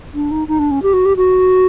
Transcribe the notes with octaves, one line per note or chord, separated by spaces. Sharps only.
D4
D#4
D#4
D4
C#4
G4
F#4
G4
F#4